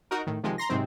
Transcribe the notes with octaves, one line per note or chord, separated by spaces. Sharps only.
D#4 F#4 A#4
A2 D#3
C3 D#3 F3 G#3
A#5 C6 A#6
G#2 C3 D#3 F#3 C4